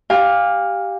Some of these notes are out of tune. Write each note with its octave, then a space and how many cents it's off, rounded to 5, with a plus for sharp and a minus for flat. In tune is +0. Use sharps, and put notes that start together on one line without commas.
G4 -5 F5 +10 G#5 -45